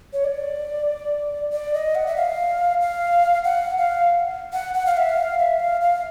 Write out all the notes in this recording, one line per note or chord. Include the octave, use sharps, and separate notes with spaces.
C#5
D5
D5
D#5
F#5
E5
F5
F5
F#5
F5
F#5
F#5
F5
E5
F5
E5
F5
F5